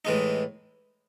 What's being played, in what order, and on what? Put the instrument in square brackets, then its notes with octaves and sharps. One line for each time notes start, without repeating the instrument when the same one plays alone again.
[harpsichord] A2 E3 G#3 D#4